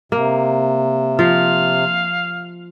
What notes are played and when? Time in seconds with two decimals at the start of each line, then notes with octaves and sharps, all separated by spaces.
0.12 C3 A#3
1.19 F3 F5